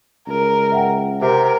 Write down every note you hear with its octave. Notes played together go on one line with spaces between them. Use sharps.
C#2 A#4
E5 F#5 G5
C3 A#4